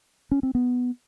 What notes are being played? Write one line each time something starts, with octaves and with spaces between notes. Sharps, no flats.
C#4
C4
B3